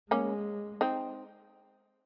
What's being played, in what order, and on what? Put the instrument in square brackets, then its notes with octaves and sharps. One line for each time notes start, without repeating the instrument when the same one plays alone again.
[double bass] G#3 [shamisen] A#3 C#4
[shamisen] C4 D#4